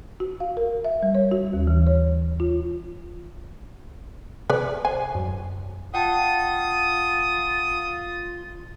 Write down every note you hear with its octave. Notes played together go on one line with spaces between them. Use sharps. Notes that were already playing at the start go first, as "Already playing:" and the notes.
F#4
F5
A#4
E5
G3
C#5
F#4
D#2
E3
C#5
F4
C3 B4 D5
C5 G#5
F#2
F4 F#5 G5 A5 D#6